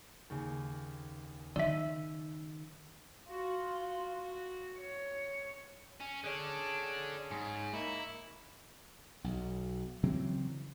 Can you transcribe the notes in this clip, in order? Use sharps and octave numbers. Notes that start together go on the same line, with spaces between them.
D#2 C#3
D#3 D5 E5 E6 D#7
F4 F#4
C#5
C#4
D3 C#4 D4 G#4
G#2
A#3 D#4 E4 C#6
B1
C#3 E3 F#3 C4